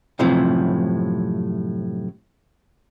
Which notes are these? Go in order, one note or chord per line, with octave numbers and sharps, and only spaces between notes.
F#2 A2 C3 E3 F3